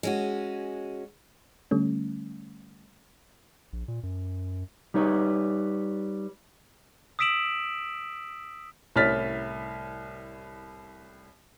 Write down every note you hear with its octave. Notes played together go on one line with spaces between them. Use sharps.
G#3 C#4 F#4
D3 G3 A3 C#4
A#1
A#2
F#2
G3 D#4 B4 C#5
D#6 E6 B6 D7 E7 F#7
C2 A2 C#4 F6 A6 B6